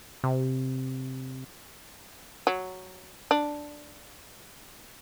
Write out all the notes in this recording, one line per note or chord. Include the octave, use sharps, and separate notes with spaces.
C3
F#3
D4